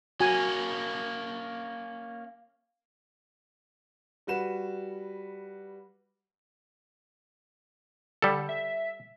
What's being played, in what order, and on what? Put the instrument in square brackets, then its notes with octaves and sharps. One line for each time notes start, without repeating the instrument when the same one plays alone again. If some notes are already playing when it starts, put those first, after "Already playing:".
[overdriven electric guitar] A#3 C#4 [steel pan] F#4 G#5
[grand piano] G3 F#4 B4 E7
[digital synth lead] D3 [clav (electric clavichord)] G3 A4
[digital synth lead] E5